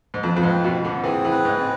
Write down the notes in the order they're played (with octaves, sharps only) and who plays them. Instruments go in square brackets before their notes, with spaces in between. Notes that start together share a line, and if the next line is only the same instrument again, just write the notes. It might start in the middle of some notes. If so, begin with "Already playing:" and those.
[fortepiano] G#2
[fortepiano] F2 [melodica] B4
[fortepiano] F2
G#2
[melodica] C4
[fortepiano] B2
[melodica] C4
[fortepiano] D3
[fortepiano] E3 [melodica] G#4
[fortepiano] E3
[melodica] B4
[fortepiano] G#2
[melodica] C4